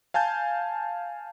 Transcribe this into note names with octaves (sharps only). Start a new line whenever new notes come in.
F5 G#5 A5 G6